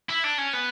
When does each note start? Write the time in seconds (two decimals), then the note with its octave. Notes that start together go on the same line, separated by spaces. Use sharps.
0.09 E4
0.24 D4
0.38 C#4
0.53 B3